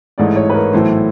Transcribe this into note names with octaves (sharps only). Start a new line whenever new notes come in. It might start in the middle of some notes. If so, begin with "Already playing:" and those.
A1 G#2 E3 A3 D5
C#5
B4
A#4
B1 A2 E3 A3 C5